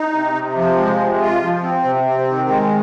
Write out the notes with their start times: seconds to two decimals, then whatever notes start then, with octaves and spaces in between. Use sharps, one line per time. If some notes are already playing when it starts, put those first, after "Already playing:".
Already playing: D#4
0.13 C3
0.34 C3
0.56 F3
0.78 G#3
0.99 C3
1.21 F4
1.42 F3
1.63 C4
1.85 C3
2.06 C4
2.28 D#3
2.49 G#3